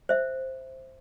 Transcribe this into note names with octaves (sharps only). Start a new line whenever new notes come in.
C5 E5